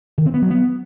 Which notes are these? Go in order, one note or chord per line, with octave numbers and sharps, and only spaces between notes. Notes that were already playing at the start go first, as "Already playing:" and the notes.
D#3
C4
B3
F#3
B3